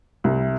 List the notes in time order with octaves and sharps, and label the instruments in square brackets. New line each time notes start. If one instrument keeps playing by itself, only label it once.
[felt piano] C2